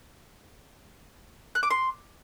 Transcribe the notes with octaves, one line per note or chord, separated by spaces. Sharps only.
F#6
D6
C6